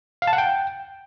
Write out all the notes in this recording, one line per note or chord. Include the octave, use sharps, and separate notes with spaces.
F5
A5
F#5
G5